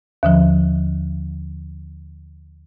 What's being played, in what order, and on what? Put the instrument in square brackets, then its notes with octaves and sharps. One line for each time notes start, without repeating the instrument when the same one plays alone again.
[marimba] D#2 D3 F3